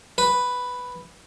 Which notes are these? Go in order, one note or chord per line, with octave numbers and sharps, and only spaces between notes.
B4